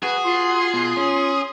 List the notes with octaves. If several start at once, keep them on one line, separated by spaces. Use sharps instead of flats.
F#4 G#4 B4
F4 C6
B2
C#4